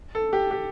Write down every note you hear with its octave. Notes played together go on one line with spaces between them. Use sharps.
A4
G4
G4